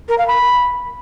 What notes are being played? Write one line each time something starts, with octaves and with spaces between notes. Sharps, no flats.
A#4
F5
B5